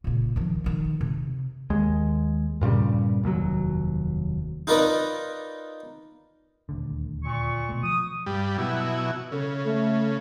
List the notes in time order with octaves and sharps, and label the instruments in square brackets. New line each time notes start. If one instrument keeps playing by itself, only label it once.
[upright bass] A#2 C#3
D#3 F3
D3 D#3
C3
[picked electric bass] D#2 G#3
G2 A#2 C#3 G3
F1 D#2 B2 F#3
[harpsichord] D#4 F4 A#4 B4 D5 D#5
[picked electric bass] D#1 D2 D3
[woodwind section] A#2 C#6
[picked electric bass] B2 A3
[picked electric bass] F3 [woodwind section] D#6
[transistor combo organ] G2 G3
B2 F#3 E4
[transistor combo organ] C#3 [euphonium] A4
[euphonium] A3